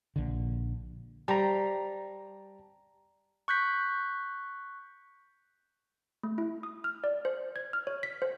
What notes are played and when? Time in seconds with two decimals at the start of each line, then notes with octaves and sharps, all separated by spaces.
0.16 A#1 D3
1.28 G3 C5 A5 A#5
3.48 C#6 F#6 G6 B6
6.23 A3
6.38 E4
6.63 D#6
6.84 F6
7.04 D5
7.25 C5
7.56 G#6
7.73 F6
7.87 C#5
8.03 B6
8.22 C5